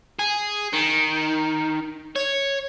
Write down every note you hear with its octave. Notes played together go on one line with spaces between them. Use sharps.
G#4
D#3
C#5